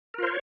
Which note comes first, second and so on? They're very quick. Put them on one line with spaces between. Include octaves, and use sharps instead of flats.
A#4 F4 C5 C#5